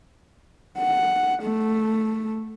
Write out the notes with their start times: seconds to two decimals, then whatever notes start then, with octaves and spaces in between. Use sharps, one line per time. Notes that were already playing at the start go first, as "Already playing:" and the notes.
0.78 F#5
1.44 A3